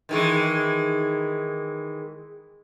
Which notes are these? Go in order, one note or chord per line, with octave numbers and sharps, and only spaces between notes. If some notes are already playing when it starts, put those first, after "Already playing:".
D#3 E3 G#3